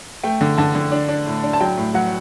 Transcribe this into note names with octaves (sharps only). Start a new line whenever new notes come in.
A3 G5
D3
D3 A5
D3
D4
D4
A2
D4
A5
F#3 G5
A2
F#3 F#5